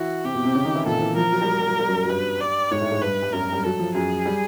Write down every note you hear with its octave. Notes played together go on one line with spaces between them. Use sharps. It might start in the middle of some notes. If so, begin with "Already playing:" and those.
Already playing: E3 E4 F#4
C3 C4 G4
B2 B3
C3 C4
C#3 C#4
D#3 D#4
E3 E4
A#2 A#3 A4
E3
F3 A#4
F#3
G3
F#3
G3
F#3
G3
F#2 F#3
F#3
G2 G3 B4
D5
G#2 G#3 C#5
A2 A3
G#2 G#3
G2 G3 B4
G3
F#2 F#3 A#4
G3
F#3 A4
F3
F#2 F#3 G#4
G3